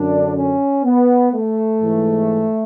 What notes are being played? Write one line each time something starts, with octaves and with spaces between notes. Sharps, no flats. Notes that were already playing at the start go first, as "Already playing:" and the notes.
Already playing: F#2 D3 D4
C#4
B3
A3
G#2 E3